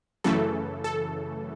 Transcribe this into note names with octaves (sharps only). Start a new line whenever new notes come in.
F#2 C#3 E3 A3 A4
A4